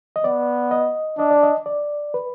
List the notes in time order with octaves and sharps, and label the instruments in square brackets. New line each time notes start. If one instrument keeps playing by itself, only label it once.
[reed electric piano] D#5
[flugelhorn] B3 [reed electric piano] D5
[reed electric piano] D#5
[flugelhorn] D4 [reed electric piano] D#5
[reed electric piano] D5
D#5
D5
B4